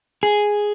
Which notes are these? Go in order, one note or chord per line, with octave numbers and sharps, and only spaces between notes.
G#4